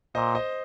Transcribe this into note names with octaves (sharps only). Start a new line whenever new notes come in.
A#2 C5 D#5
C5 D#5